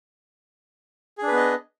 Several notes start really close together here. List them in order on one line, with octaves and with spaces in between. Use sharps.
G#4 D4 B4 B3 D#5